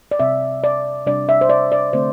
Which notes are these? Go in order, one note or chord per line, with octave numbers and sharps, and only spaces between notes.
D5
C3 G3 C4 E5
D5
C3 G3 D4 D5
E5
C5
D5
D5
D3 A3 C4 C5